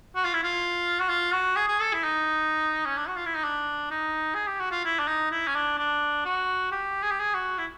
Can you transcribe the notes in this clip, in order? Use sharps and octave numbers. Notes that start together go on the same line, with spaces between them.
F#4
F4
E4
F4
F#4
F4
F#4
G#4
G#4
A4
E4
D#4
C#4
D4
F#4
F4
E4
D#4
D4
D#4
G#4
G4
F#4
F4
E4
D4
D#4
E4
C#4
D4
D4
F#4
G4
G#4
G4
G#4
F#4
E4